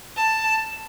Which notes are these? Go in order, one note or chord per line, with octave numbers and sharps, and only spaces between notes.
A5